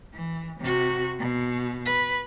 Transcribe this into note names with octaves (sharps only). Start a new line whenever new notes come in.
E3
C3 F#4
B2
B4